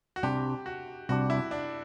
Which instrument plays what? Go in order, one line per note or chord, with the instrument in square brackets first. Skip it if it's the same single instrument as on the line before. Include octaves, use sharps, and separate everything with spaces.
[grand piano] F#4
[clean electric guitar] C2 C3 G3 D4 [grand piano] G4
[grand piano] F#4
[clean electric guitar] C2 C3 G3 D4 [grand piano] F#4
[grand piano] E4
D4